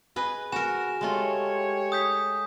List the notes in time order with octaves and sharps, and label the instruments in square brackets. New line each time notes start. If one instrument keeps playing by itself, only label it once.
[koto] G#4 B4 D#5
[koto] F#4 A#4 [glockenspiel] G#5 E7
[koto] G#3 A3 F4 [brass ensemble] G4 C#5
[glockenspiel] D#6 G6 B6